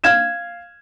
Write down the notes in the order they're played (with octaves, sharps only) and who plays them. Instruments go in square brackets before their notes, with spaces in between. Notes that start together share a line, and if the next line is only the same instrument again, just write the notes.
[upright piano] F5 F6 G#6 E7